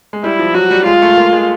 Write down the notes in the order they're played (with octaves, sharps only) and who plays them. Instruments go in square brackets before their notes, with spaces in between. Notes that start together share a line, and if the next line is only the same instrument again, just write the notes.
[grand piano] G#3
[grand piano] G3 [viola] E4
[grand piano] F3
[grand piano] F#3 [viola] F#4
[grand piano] G3
[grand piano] G#3 [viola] F4
[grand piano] A3
A#3
G#3